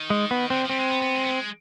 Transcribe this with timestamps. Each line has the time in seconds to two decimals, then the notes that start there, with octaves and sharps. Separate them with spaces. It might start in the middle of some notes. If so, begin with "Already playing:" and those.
Already playing: D#3
0.10 G#3
0.31 B3
0.50 D3 C4
0.65 F3
0.69 G3 C4
0.79 G#3
0.90 B3
1.02 B3
1.15 G#3
1.24 B3
1.28 G#3